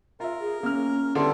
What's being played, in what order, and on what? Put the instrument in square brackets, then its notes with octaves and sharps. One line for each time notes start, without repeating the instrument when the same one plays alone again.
[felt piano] F4 E5 [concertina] A#4
[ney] G#4
[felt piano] A#3 F6 [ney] C#4
[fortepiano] D3 G3 [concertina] B3 E4 [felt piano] A4 C6